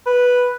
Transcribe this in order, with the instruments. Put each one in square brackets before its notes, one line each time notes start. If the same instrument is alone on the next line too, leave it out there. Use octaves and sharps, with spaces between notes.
[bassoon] B4